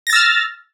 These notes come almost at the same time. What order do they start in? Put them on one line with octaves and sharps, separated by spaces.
A#6 A6 E6 F6